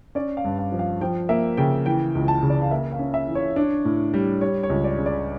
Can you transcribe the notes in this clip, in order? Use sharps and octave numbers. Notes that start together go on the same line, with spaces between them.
C#4 D5
F5
G2
F5
F3
F5
F3 G5
A#3 E5
C#3 G5
E3 G5
C#2
A5
C#3
D5
F5
A#3 E5
F5
C#4
E5
E3
C#5
D4
A2
G3
G3 C#5
C#5
C#2
D5
C#3
D5